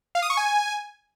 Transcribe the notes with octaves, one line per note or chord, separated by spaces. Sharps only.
F5
D#6
C#6
G#5